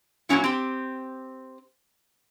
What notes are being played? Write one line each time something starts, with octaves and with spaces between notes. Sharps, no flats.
A#2 E3 F#3 C#4 E4
C4 G4